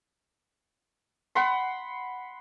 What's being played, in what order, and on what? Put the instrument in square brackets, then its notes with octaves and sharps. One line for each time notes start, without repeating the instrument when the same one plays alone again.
[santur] F#5 B5 C6